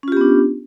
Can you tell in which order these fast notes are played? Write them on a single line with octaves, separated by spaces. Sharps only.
C#4 F4 G4 B3 D4